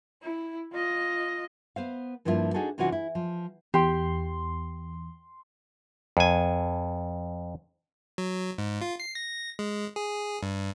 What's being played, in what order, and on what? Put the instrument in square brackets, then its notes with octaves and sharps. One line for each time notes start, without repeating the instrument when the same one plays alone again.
[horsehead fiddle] E4
F4 D#5
[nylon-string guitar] B3 C5 F5
G2 F3 A#3 B3 E4 F4
D4 D#4 F#4 G#4 A4
C3 E3 C#4 D#4 F4 F#4
E4
F3
[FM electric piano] E2 [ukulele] G4 G5 [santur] C6
[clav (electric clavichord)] F2 G#5
[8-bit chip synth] F#3
G#2
F4
C7
A#6
G#3
G#4
G2